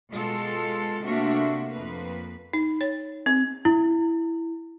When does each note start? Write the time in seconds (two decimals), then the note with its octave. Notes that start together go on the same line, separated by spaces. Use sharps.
0.11 B2 G#3 F4 A4
1.03 C3 A3 A#3 D4 F#4 E5
1.72 F2 A#3 B4
2.53 D#4
2.81 C#5
3.26 C4
3.65 E4